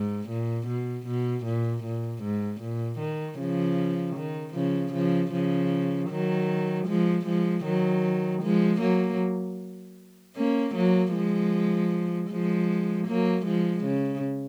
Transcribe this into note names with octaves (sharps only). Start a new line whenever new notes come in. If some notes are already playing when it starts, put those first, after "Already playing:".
Already playing: G#2
A#2
B2
B2
A#2
A#2
G#2
A#2
D#3
C#3 F3
D#3
C#3 F3
C#3 F3
C#3 F3
D#3 F#3
F3 G#3
F3 G#3
D#3 F#3
F3 G#3
F#3 A#3
A#3 C#4
F#3 A#3
F3 G#3
F3 G#3
F#3 A#3
F3 G#3
C#3